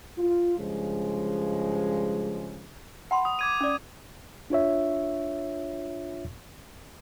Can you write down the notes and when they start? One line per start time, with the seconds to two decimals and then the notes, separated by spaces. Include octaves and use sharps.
0.18 F4
0.58 G2 C#3 F3 G#3
3.11 F#5 B5 C6
3.25 D#6
3.39 D6 G#6 D#7
3.61 C#4 D5
4.50 D4 F4 C#5 E5